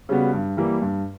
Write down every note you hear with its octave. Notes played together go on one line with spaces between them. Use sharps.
C#3 G3 B3 F#4
G2
E3 G3 A#3
G2